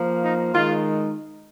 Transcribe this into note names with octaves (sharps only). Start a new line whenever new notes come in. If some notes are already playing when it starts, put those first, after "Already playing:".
Already playing: F3 A#3
D#4
D#3 G#3 D#4 F4